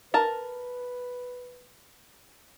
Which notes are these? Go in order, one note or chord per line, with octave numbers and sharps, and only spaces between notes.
A#4 B4 A5